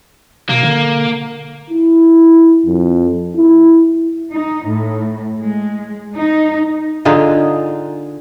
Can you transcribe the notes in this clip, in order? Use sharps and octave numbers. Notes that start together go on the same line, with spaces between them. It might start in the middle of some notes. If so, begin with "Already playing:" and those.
B2 A#3
D3
E4
F2
E4
D#4
A2
G#3
D#4
D3 D#4 F4 G#4